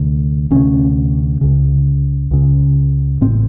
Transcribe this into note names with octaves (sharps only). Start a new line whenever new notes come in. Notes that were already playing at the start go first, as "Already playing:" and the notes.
Already playing: D2 C3
D2 C3 C#4
C#2 C#3
C#2 C#3
A1 A2 C4